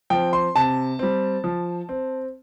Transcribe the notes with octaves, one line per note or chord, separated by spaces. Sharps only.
F3 C4 G5
C6
C3 A5
G3 C4
F3
C4